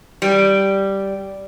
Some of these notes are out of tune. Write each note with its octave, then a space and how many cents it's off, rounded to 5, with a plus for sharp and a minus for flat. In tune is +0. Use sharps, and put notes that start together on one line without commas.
G3 -5